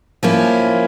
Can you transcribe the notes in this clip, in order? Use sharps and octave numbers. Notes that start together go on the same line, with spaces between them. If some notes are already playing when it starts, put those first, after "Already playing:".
F3 A#3 C#4 E4